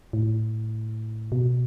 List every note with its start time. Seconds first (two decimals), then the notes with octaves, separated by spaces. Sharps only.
0.13 A2
1.32 B2